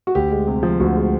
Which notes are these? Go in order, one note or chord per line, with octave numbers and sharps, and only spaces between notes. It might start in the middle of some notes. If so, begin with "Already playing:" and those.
F#4
D2 G4
G#3
C3
F3
D2 F#4
G#3